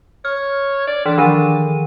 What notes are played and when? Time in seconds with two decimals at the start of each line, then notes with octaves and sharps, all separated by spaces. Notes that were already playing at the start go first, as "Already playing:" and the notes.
0.25 C#5 F6
0.87 D5
1.06 E3 D4
1.18 D#3 F3 D#7